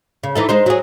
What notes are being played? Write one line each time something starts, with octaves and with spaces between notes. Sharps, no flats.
C#3
E3 D#4 A4
G#3 D#4 C5
F#3 G#4